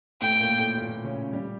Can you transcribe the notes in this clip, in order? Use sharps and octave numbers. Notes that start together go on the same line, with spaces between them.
A2 A3 G5
A#2 A#3
A2 A3
A#2 A#3
C#3 C#4
G3 G4